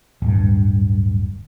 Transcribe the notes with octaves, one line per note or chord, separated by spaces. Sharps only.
D1 G2